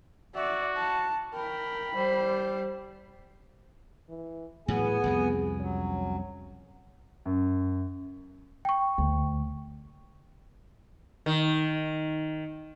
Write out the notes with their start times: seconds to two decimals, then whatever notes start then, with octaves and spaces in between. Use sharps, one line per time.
0.35 F#4 D5 E5
0.76 A5
1.34 A#4 G5 B5
1.94 G3 C5
4.09 E3
4.68 A2 E3 F#3 B3 G#4 G#5
5.04 C2 F2 C3
5.61 F#3 C#4
7.25 F#2
8.65 G5 C#6
8.98 D2
11.26 D#3